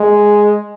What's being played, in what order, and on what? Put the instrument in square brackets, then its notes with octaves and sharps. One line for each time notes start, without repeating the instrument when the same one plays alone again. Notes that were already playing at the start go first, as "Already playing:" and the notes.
Already playing: [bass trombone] G#3